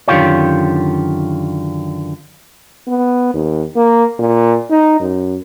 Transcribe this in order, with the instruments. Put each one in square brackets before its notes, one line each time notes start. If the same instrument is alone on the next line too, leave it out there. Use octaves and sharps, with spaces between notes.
[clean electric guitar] F#2 D3 D#3 F4 G4 C#5
[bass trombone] B3
D#2
A#3
A#2
D#4
F#2